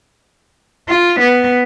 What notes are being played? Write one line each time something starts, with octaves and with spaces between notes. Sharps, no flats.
F4
B3